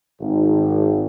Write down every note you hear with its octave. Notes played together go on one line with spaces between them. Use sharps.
G#1